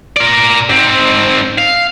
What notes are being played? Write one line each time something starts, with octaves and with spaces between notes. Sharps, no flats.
A#4 D5
G#2 C4
F5